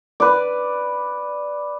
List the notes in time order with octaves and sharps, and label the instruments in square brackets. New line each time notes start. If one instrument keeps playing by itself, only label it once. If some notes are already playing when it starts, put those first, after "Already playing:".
[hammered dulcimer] B4 D5